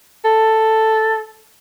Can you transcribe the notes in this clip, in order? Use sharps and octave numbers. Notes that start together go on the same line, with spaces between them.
A4